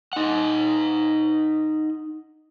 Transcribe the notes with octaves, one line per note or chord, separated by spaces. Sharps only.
D#4 F#5